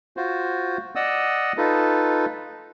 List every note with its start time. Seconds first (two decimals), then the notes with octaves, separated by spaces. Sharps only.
0.17 F4 F#4 C5
0.95 D5 D#5 F#5 D#6 E6
1.57 D#4 F4 A4 B4